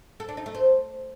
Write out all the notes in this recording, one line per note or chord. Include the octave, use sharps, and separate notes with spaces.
A4
D4
D#4
A3
C5